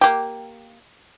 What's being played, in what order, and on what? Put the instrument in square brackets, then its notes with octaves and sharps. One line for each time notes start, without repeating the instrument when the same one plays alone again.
[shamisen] A#3 G4